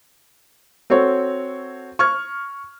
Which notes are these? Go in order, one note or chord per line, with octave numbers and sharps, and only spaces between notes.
C4 F#4 A4 C#5
C#6 F6 G#6